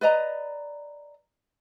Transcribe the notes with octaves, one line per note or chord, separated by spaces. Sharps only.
B4 D5 D#5 A#5